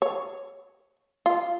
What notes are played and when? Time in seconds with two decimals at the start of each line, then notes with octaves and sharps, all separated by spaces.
0.02 C#5
1.26 F4